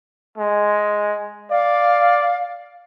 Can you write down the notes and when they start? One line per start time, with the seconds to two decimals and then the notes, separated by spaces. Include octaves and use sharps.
0.38 G#3
1.51 D5 F5